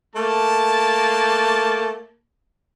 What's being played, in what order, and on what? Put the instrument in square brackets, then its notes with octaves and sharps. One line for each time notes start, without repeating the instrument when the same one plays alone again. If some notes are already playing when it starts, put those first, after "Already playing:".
[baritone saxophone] A3 [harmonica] A#3 [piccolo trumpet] A5